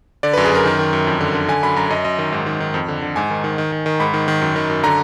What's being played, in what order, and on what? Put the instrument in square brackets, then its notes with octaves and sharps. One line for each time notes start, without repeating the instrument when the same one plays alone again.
[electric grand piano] D3 D5
F#2 B4
G#4
F#2 A#4
D#3
D#3
F#2
F2
D3
D3
D3 G#5
F#2 B5
F#2 A#5
F#2 D#5
F#2 D#5
D#3
G#2
D#3
D#3
F2
D3
D3
G#2 G#5
D#3
D#3
D#3
D#3
D#3
G#2 B5
D#3
D#3
F#2
D#3
F#2
D3 A#5